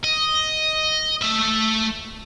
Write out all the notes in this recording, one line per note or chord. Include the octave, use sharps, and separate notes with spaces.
D#5
A3 E5